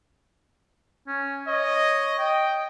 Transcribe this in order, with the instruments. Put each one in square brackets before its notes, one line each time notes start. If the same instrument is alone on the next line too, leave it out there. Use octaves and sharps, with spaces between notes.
[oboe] C#4
[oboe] C#5 [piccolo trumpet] D#5
[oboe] D#5 [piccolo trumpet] G5